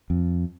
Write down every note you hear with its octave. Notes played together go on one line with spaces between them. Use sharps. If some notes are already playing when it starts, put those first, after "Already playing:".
F2